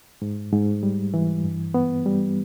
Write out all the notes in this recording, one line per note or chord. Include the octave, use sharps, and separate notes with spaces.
G#2
G#2
G3
E3
G2
B3
G3